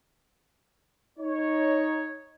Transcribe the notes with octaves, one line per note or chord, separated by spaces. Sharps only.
D#4 C#5